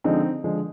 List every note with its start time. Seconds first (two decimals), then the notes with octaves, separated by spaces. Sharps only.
0.04 D3 F3 G#3 C4 D#4
0.44 D3 F3 G#3